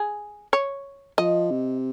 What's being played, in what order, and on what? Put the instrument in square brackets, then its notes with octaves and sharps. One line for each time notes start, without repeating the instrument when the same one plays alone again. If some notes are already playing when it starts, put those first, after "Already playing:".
Already playing: [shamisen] G#4
C#5
[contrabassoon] F3 [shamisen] D#5
[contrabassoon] C3